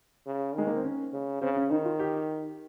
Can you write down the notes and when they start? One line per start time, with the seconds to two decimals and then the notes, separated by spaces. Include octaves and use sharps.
0.26 C#3
0.55 D#3 G#3
0.67 A#3
0.75 C4
0.84 C#4
1.13 C#3
1.42 C#3 C4
1.57 C#4
1.71 D#3 D#4
1.85 F4
2.00 G4